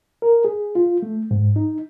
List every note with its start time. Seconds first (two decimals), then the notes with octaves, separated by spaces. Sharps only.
0.22 A#4
0.45 G#4
0.75 F4
1.02 A3
1.31 G#2
1.56 D#4